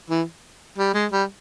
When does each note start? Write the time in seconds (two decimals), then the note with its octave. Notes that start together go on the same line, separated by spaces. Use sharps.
0.10 E3
0.78 G3
0.94 G#3
1.11 G3